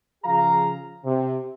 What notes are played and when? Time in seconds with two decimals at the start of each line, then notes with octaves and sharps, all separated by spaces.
0.24 C#3 F3 G#4 F5 A#5
1.04 C3